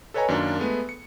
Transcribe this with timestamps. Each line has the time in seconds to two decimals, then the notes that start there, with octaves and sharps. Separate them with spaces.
0.14 A4 B4 C#5 D#5 G#5 A#5
0.28 F#2 D#3 A#3 D4 F4
0.59 G#3 A3 B3
0.89 C#7